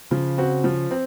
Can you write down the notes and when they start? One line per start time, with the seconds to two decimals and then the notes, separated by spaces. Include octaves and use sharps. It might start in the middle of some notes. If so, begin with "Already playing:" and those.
0.11 C#3 F3
0.38 C4 F#4
0.64 F3
0.91 C4